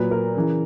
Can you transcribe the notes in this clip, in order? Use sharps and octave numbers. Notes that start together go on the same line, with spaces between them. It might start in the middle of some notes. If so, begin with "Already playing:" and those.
Already playing: A#2 F#3 B4
A#4
C#3 E3